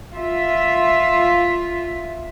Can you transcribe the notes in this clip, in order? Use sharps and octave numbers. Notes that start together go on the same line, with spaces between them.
F4 E5